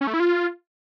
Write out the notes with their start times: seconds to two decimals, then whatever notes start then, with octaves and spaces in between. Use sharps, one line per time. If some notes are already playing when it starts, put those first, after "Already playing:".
0.01 C#4
0.07 A3
0.14 E4
0.20 F4